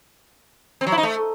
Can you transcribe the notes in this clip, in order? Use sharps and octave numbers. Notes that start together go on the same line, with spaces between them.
C4
F#3
E4
D#4
A3